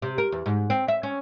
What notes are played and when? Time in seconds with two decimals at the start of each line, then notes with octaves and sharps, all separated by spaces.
0.02 C3
0.18 A#4
0.32 E2
0.46 G#2
0.70 C4
0.88 E5
1.03 C#4